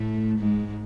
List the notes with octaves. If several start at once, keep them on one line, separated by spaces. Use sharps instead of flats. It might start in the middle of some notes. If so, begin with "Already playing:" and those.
Already playing: A2 A3
G#2 G#3